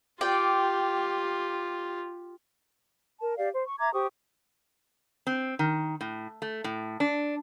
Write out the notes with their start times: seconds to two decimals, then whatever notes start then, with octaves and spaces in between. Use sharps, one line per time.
0.21 F4 G4 D5 G5
3.20 A#4 A5
3.37 G4 D5 F5
3.53 C5
3.67 C#6
3.79 E5 A#5 D6 G#6
3.93 G4 C5 C#6 D#6
5.27 C4
5.59 D#3
6.01 A2
6.42 A3
6.64 A2
7.00 D4